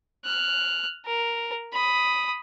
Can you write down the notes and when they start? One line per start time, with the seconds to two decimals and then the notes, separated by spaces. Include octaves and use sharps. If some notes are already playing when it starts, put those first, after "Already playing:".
0.25 F6 F#6
1.06 A#4
1.73 B5 D#6